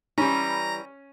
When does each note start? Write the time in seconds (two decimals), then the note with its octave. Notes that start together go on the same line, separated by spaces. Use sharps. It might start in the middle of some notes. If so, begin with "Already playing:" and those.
0.18 E3 G3 C#4 A#5